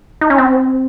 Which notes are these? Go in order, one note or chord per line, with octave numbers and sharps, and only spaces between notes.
D#4
C#4
C4